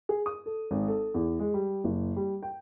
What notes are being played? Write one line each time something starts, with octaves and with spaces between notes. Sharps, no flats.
G#4
D#6
A4
G#1
A4
E2
G#3
G3
F#1
G3
G5